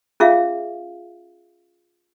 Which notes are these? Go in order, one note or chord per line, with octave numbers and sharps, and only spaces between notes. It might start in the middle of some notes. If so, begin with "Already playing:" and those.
C#4 F4 G#4 E5 F5